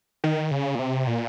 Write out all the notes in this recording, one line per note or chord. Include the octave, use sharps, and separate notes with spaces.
D#3
C#3
A#2
C3
A#2